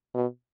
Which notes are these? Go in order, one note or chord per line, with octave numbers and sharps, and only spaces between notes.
B2